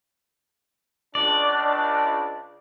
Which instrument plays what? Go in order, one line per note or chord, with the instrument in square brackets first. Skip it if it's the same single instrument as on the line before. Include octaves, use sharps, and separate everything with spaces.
[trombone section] C#2 D4 [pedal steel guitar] D5